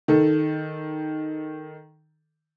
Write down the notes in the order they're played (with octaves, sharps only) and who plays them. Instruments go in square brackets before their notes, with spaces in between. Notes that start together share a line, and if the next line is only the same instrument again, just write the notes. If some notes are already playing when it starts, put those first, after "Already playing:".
[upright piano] D#3 A4